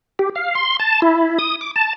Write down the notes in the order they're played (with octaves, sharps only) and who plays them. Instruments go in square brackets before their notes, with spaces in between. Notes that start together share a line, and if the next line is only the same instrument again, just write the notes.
[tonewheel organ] G4
F5
C6
A5
E4
D#6
D6
A5